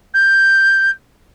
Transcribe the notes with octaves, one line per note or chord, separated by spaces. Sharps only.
G6